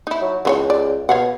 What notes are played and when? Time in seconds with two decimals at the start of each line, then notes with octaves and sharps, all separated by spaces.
0.07 D#4 E4
0.21 F#3
0.45 C#2 E3 F4 C#5
0.70 D5
1.09 B2 C#5 F5 F#5